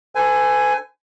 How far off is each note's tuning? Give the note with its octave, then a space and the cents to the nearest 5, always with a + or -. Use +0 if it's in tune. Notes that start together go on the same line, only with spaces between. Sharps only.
A4 +10 C5 -45 G#5 +0